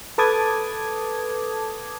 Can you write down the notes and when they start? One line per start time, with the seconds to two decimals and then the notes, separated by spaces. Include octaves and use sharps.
0.18 A4 B4 A5 D6 D#6 G#6